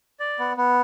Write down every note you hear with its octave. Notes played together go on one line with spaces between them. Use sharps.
D5
B3
B3